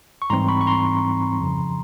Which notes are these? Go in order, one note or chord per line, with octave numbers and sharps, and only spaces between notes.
C#6
G#2 E3 G3 C4 D#4 A#5 C6
B5 C#6
C#6
A#5 C6
F2 C#3 F3